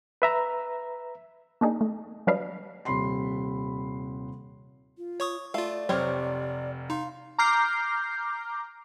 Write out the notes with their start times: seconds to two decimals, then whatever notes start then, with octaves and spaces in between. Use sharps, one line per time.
0.22 B4 E5 A#5
1.61 A#3 D4 D#4 G#4
1.81 A3
2.27 F#3 G3 D4 B4 D#5 F5
2.85 D#1 C3 B5 C6 C7
4.98 F4
5.20 C#5 C#6 D#6
5.54 A3 F4 D5 F5
5.89 F1 C3 F#3 G4 C5 C#5 F6
6.90 D#4 F5 C6
7.38 A#5 D6 F6 G6 C7